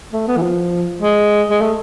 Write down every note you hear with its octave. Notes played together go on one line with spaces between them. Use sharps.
A3
B3
E3
F3
G#3
G#3
A3